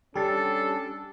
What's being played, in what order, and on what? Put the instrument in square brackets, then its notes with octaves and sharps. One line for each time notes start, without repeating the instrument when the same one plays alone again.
[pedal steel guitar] G3 D4 [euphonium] C#4 [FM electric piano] G4 [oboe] A4